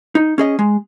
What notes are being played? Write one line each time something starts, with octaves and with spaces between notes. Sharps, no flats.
D#4
C#4 G#4 D#5
G#3